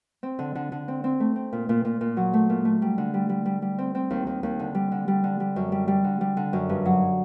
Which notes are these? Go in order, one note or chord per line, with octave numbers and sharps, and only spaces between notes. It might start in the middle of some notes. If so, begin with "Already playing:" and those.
C4
D3
D3
D3
C4
C4
A3
C4
A#2
A#2
A#2
A#2
F#3
A3
A#2
A3
G3
D3
G3
G3
G3
G3
C4
C4
D#2
D#2
D#2
D3
G3
D3
G3
D3
G3
F#2
G3
G3
D3
G3
D3
F#2
G2
F#3